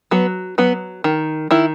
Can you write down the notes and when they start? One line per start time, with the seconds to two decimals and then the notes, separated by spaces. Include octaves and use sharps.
0.11 F#3 B3 B4
0.58 F#3 B3 B4
1.04 D#3
1.51 D#3 E4